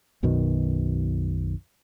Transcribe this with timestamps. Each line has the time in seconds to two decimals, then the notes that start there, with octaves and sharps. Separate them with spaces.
0.23 B1 F#2 B2 D#3